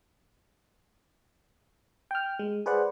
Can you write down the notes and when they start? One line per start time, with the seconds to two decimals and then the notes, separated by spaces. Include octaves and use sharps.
2.11 G5 F6
2.39 G#3
2.66 G#4 B4 C5 D5 F#5